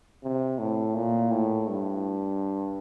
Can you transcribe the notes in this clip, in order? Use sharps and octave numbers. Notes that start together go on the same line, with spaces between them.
C3
A2
A#2
A2
G2